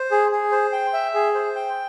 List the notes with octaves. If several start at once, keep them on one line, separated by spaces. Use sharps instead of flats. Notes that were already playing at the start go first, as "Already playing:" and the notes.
Already playing: C5
G#4
G#4
C5
G5
E5
G#4
C5
G5